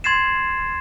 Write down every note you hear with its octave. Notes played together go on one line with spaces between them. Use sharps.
C6 G#6 A6 C7 E7